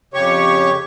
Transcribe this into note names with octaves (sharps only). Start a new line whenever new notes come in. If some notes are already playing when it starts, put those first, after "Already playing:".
F2 C#3 G4 C#5 C#6